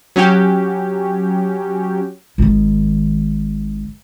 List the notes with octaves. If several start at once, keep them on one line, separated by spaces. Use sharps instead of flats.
F#3 C#4 F#4 G4
G#1 D#3